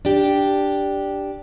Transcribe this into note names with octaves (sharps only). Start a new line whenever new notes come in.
D4 G4